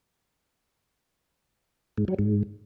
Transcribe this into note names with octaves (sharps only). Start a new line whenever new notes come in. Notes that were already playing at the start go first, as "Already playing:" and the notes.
G#2
F#3
G#2